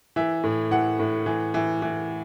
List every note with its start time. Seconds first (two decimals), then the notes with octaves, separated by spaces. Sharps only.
0.16 E3 E5
0.43 A2
0.71 E3 F#5
0.99 A2
1.26 E3
1.54 E3
1.82 E3